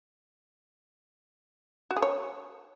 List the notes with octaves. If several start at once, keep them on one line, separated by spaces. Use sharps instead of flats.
F#4
G#4
C#5